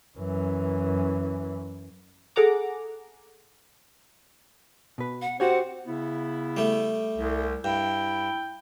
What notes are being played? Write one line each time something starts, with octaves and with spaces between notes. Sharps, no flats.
F#2 E3
G#4 A4 F#5 A#5 D6
B2 B4
F#5
C4 F#4 G4 C#5 F#5
C#3 B3 E4
G3 A3
C2
G2 E4 G5